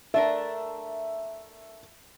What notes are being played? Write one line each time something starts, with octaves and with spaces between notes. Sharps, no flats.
A3 D4 A#4 E5